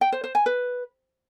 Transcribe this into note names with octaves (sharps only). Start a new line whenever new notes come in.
G5
C5
C5
G#5
B4